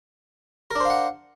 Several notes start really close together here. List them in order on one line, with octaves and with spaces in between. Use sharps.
A#4 D4 C5 F5 F#5